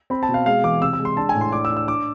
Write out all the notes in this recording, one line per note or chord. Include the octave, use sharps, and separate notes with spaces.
C4 B5
A5
B2
F5
G#3 F5
E3 D6
C3 E6
E6
G#3
C6
D4 A5
G#5
A2
C6
D4 D6
E6
D4
E6
D4 D6